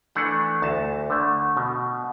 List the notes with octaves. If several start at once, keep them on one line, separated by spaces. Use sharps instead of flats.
E3 A3 D4 F#5
D2 A5
D3 A3
B2